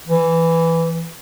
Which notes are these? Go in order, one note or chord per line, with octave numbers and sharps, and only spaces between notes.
E3